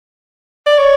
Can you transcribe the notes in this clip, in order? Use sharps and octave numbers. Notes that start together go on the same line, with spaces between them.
D5
C#5